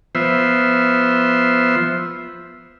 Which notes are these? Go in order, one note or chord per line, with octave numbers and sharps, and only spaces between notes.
F3 B3 C5 E5